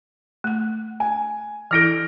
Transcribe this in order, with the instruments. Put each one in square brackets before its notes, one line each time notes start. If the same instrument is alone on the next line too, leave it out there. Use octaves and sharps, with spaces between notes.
[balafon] A3 F#5
[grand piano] G#5
[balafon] E3 E4 A4 [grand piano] F6 A#6 D7